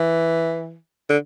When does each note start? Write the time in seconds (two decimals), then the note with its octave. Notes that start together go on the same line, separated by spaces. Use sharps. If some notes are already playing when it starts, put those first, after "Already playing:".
Already playing: E3
1.09 D3